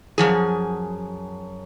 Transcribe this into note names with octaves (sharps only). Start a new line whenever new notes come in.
F#2 F3 G#4